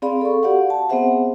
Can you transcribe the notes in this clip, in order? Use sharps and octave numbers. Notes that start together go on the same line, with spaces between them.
C4 G#4 D5 F5 B5
A4 C#6
F#4 G4 D5 F5 F#5
F#5 A5
B3 C4 G#4 C5 E5 F#5